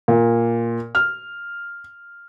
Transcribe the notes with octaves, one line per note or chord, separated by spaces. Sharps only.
A#2
F6